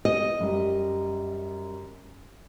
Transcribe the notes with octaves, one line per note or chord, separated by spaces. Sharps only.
D#5
F#2 G3